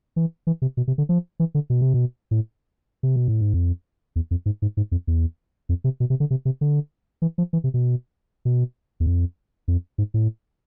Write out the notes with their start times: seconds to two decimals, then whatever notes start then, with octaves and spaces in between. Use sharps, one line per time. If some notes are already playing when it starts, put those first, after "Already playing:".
0.16 E3
0.47 E3
0.62 C3
0.77 B2
0.88 C3
0.98 D3
1.09 F3
1.40 E3
1.55 D3
1.70 B2
1.81 C3
1.94 B2
2.31 A2
3.03 C3
3.16 B2
3.28 A2
3.41 G#2
3.54 F2
4.16 E2
4.31 F2
4.46 G#2
4.62 G#2
4.77 G#2
4.92 F2
5.07 E2
5.69 F2
5.84 C3
6.00 B2
6.10 C3
6.20 D3
6.30 C3
6.45 C3
6.61 D3
7.22 E3
7.38 F3
7.53 E3
7.64 C3
7.74 B2
8.45 B2
9.00 E2
9.07 F2
9.68 F2
9.98 G#2
10.14 A2